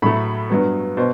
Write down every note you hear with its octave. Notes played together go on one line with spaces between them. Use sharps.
A2 F#3 A3 B5
G2 F#3 B3
B2 C5